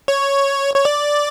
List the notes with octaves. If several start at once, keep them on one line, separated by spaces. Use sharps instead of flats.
C#5
C#5
D5